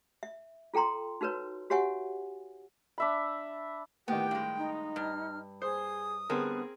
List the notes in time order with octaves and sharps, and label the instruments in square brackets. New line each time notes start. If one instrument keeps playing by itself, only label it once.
[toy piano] E5
F4 A4 G5 A#5 C6
D#4 F#4 A#4 B4 C#5
F#4 G4 C#5 E5 F#5 G#5
[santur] D4 E5 B5
[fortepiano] A2 D#3 [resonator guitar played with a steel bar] B3 [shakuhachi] G4 [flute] G5
[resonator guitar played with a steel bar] G2 G#3
[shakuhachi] D#4
[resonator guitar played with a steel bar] G2 [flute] F6
[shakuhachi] G#4 [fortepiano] C5 [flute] D#6
[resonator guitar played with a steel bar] D3 G3 [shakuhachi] B3 [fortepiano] C4 G#4 A#4